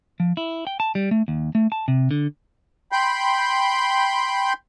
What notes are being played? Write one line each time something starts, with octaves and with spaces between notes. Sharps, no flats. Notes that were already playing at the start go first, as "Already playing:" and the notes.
F3
E4
G5
A5
G3
A3
D#2
A3
A5
C3
D3
G5 B5 C6 G6